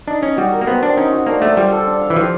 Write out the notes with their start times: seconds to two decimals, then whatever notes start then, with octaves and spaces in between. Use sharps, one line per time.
0.07 D4 D#4
0.22 C#4 D#5
0.37 G3 F#4
0.52 A#4
0.61 A#3
0.67 B3 C4
0.82 C4 D4
0.97 C#4 D#4
1.12 F#4
1.27 A#3 D4
1.42 A3 D4
1.57 G3 F4
1.72 A4
1.87 D4
2.01 F5
2.10 E3
2.17 F3 G4